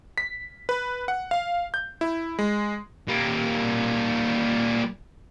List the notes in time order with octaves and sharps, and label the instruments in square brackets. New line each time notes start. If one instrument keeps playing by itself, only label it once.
[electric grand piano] B6
B4
F#5
F5
G6
E4
G#3
[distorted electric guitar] G3 A#3